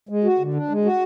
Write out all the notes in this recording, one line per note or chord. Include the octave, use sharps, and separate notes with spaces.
G#3
F#4
D3
D4
G#3
F#4